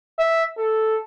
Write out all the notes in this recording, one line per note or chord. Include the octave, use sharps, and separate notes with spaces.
E5
A4